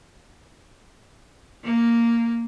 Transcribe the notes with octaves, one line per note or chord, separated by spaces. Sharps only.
A#3